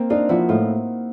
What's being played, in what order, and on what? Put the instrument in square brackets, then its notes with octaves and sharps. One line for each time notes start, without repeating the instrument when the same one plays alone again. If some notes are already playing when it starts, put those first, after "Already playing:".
Already playing: [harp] A#3 C4
[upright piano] D4 [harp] D#4 F4
[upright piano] F3 [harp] E4 F#4
[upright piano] A2 [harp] D#4 F4